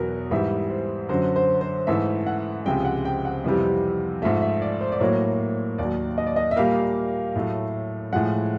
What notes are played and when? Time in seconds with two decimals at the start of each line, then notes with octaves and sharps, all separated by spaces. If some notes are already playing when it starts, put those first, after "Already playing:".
Already playing: E2 B2 F#3 F#4 A#4
0.31 G#2 E3 G3 E5
0.70 C5
1.09 F#2 D3 F#3 C5
1.36 C5
1.61 C5
1.87 G#2 E3 A3 E5
2.26 F#5
2.66 C#2 C3 F3 G#3 G5
2.85 F#5
3.05 G5
3.25 F#5
3.44 F2 C3 E3 G3
4.22 G#2 F3 A3 E5
4.42 E5
4.62 D5
4.81 C5
4.92 D5
5.00 A2 F#3 A#3 C#5
5.78 D#2 D#3 F#3 D5
6.18 D#5
6.26 D5
6.36 D#5
6.51 E5
6.56 A#2 G3 A#3 F5
7.36 A2 F#3 A3
8.13 A2 F3 G#3 F#5